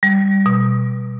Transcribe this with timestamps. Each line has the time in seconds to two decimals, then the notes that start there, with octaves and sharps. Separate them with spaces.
0.03 G3
0.46 B2